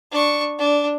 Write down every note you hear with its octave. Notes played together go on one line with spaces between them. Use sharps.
D4 C#6
D4